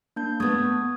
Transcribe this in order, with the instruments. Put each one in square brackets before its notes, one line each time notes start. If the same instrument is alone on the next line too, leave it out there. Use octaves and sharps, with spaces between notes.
[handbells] A#3 D4 G6
[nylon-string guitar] A3 B3 [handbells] D#6 G#6